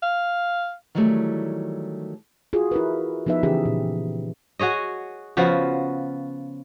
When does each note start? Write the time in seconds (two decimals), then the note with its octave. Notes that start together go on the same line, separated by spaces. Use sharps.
0.03 F5
0.95 D#3 E3 F#3 G3 A3
2.53 F4 F#4 G#4
2.72 E4 A#4 B4
3.26 F3 B3 D#4 B4 E5
3.43 C#3 E3 C#4 G4 G#4
3.65 A#2
4.59 F#4 G#4 C#5 D#5
5.37 C#3 F3 B3 F#4